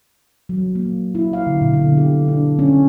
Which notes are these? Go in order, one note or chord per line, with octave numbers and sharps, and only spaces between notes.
F#3
A#3
E4
F5
D3
B2
D3
G4
D4
C#4